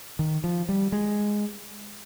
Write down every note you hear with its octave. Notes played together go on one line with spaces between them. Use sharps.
D#3
F3
G3
G#3